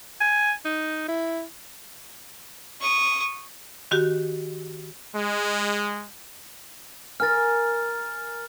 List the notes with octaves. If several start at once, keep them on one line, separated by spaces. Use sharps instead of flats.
G#5
D#4
E4
C#6 D#6
D#3 F#4 G4
G#3
A#4 G#5 F6 A6